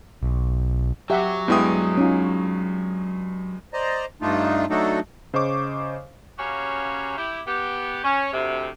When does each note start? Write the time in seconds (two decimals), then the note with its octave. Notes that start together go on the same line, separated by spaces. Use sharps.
0.23 B1
1.10 F#3 F#4 G4 E5 F#5
1.48 G2 G#3 B3 E4 G5 D#6
1.98 C#4 D#4 F4
3.73 C5 D5 D#5 A#5
4.22 G2 A3 D4 D#4 F4
4.70 F#3 A3 D4 D#4 F#4 A4
5.34 C#3 C5 D#5 C#6 D6
6.38 C#3 A#3 C#4 F#4 G4
7.18 E4 G4
7.47 B3 G4
8.04 C#4
8.33 D2 C3